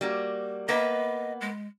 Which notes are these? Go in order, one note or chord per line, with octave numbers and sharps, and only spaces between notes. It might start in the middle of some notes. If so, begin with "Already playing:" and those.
G3 A#3 F#4
A#3 B3 B4 D#5
G#3